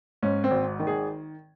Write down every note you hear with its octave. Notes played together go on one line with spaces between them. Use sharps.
G#2 C#4
C4
G#1
D#3
G#4